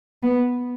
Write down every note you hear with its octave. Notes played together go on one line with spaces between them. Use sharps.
B3